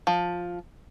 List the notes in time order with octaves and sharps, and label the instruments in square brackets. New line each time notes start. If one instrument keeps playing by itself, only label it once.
[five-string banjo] F3